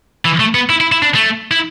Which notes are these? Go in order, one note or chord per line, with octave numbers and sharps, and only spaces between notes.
E3
A3
B3
E4
E4
E4
D4
A3
E4